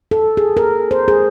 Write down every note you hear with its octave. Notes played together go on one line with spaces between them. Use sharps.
A4
G#4
A#4
C5
G#4